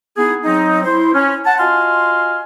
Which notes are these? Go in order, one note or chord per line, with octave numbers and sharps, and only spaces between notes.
B3 D#4 E4 G#4
F#3 C4 D#4
E4 C5
C#4
F#5 A5
F4 F#4 D#5 F5 G#5 C6